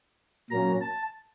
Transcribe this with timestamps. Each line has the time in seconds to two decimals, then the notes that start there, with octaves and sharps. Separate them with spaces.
0.50 A#2 F#3 A#3 C#4 A#5
0.81 A5